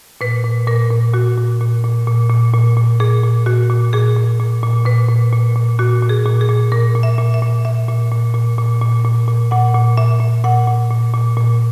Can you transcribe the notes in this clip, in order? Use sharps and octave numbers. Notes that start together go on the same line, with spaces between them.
A#2 B4
A#2
A#2 A#4
A#2
A#2 F#4
A#2
A#2
A#2
A#2
A#2
A#2
A#2
A#2 G#4
A#2
A#2 F#4
A#2
A#2 G#4
A#2
A#2
A#2
A#2 B4
A#2
A#2
A#2
A#2 F#4
A#2
G#4
A#2
G#4
A#2
A#2 A#4
A#2
E5
A#2
E5
A#2
A#2 E5
A#2
A#2
A#2
A#2
A#2
A#2
A#2
A#2 F#5
A#2
A#2 E5
A#2
A#2 F#5
A#2
A#2
A#2
A#2